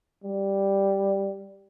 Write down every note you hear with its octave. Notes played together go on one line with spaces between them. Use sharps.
G3